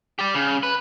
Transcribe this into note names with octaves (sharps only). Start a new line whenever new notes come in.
G4 D5
C#3
B4